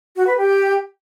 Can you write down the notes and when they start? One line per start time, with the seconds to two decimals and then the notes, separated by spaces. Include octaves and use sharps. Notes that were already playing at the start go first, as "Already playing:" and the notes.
0.16 F#4
0.27 B4
0.38 G4